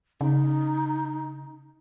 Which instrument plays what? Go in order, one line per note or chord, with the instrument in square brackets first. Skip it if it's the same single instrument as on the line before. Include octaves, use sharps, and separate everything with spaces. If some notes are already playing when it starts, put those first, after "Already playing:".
[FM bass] C#3 [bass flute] D#4